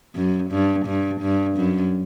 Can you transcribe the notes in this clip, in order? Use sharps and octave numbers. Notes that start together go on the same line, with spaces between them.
F#2
G2
G2
G2
F#2